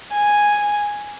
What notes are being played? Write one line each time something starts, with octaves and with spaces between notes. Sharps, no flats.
G#5